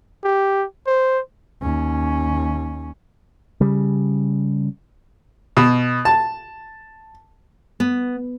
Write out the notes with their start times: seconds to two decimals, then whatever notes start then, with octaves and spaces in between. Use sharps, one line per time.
0.24 G4
0.87 C5
1.62 D#2 C#4
3.61 C#3 G3
5.57 B2
6.05 A5
7.80 B3